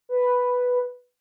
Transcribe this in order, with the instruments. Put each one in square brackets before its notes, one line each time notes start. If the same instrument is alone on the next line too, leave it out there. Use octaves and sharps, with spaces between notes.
[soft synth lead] B4